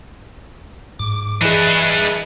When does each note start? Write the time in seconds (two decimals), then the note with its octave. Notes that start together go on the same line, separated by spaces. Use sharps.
0.99 G#2 D6
1.41 E3 D4 G#4 B4 D#5 E5 G#5